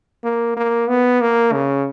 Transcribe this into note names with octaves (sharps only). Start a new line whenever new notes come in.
A#3
A#3
B3
A#3
C#3